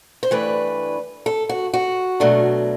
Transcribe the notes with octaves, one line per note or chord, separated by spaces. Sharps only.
C5
G2 E3 A3 D4 B4
A4
F#4
F#4
B2 F#3 A3 D4